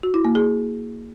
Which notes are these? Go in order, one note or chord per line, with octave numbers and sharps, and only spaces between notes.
F#4
E4
A#3
G#4